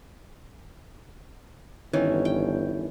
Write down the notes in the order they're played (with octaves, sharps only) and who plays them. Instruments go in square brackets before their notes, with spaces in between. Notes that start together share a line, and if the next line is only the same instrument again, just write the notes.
[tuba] G1 [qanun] D#3 E3 C#4
[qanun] G5